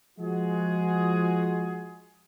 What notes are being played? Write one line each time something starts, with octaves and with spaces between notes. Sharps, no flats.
F3 G#3 F#4 G#4